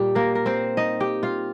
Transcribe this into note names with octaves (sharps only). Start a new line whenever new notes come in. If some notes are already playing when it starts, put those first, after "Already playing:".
Already playing: A#2 G3 G4
A#3 A#4
A#4
C4 C5
D#4 D#5
G4 G5
F4 F5